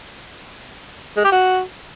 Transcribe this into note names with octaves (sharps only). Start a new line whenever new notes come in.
G#3
G4
F#4